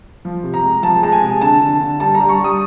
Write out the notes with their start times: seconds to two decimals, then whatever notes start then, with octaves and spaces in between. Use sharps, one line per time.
0.25 F3
0.44 C3
0.54 A#5
0.64 G#3
0.83 F3 A5
1.03 G#3 A5
1.12 G#5
1.22 C3
1.41 D3 A5
1.61 D3
1.81 D3
2.00 G3 A5
2.15 A#5
2.20 G3
2.29 C#6
2.39 G3
2.44 D#6